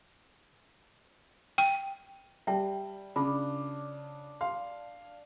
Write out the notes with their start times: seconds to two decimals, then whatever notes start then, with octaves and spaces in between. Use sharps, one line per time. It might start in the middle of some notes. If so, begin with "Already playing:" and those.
1.58 G5
2.47 G3 E5 G5 A5
3.16 C#3 D4 F4 B5
4.41 F5 C6